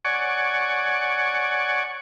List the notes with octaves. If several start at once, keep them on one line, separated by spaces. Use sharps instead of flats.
C#5 D5 F#5 G#5 C#6